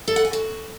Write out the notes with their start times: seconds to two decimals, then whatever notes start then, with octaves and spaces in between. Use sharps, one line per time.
0.08 A4
0.16 F#5
0.25 G#5
0.33 F#4